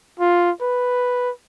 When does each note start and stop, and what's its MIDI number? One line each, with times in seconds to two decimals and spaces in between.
0.20 0.51 65
0.61 1.31 71